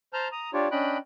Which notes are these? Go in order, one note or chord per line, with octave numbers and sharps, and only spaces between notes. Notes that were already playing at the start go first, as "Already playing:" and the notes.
C5 A5 A#5 F6 G6
A#5 D#6
D4 F4 G4 C#5 D5
C#4 D4 D#5 G5 B5 F#6